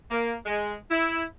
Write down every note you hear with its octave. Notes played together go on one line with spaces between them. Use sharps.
A#3
G#3
E4